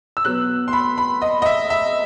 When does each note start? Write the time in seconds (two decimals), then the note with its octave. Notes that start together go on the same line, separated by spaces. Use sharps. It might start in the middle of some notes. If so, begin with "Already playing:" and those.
0.17 E6
0.24 B2 F#3 B3 F#6
0.68 C6
0.73 B5
0.98 B5
1.22 D#5
1.42 D#5
1.46 E5
1.70 E5